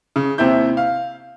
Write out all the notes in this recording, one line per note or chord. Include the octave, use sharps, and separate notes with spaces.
C#3
D#2 C3 C4 E4 G6
F5